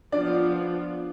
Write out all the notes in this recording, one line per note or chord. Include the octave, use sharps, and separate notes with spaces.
F3 B3 D4 F4 D5